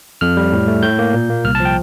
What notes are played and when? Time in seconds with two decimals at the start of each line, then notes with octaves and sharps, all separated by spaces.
0.21 F2 F6
0.37 G3
0.52 A2
0.68 A3
0.83 A2 G6
0.99 A#3
1.14 A#2
1.30 A#3
1.44 C2 F6
1.55 A5
1.60 F3
1.65 G5